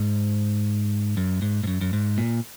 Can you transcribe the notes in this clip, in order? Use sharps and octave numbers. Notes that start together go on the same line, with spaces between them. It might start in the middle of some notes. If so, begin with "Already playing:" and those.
Already playing: G#2
F#2
G#2
G#2
F#2
F#2
G#2
A#2